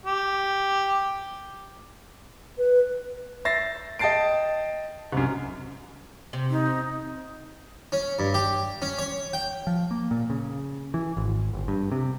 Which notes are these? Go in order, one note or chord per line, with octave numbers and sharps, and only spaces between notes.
G4
B4
E5 A6 A#6 C7
D#5 G5 A5 A6 C7 D7
C2 F#2
C3
D#4
C#4
G2
G4
C#4
C#5
G5
F3
A#3
A#2
C#3
E3
G#1
G1
G2
C3